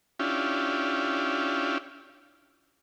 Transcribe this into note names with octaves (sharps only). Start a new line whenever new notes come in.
C#4 D4 E4 F4 G4